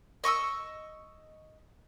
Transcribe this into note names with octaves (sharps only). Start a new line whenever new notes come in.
D#5 C#6 D#6 E6